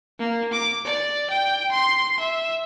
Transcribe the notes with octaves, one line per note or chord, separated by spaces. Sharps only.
A#3
D6
D5
G5
C6
E5